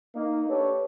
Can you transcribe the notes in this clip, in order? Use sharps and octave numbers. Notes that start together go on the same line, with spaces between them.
A#3 D#4
D4 G4 A4 B4 C#5